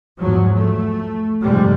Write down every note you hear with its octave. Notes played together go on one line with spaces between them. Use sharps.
E2 G#2 F3 F#3
A3
F2 G#2 C3 G3